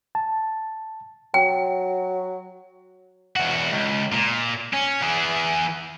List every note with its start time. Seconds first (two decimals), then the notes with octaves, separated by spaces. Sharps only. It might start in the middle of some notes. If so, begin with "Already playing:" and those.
0.15 A5
1.34 F#3 G5
3.36 E2 F#4
3.72 C#2
4.12 A#2
4.73 C#4
5.02 E3 G#4